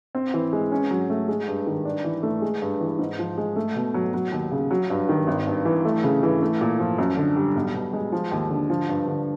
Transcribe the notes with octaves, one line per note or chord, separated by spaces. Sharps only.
C4
E3
G#3
C#4
F#3
A3
G#3
G2
D#3
D4
E3
A3
G#3
G2
E3
G#2
F3
G#3
A3
B2
F#3
F#3
D#2
C#3
F#3
G2
D#3
G#1
G2
E3
A3
C#3
E3
A3
A#2
F3
F#2
D3
G3
B1
B2
G#3
F3
D#2
D3
F3
G2
D3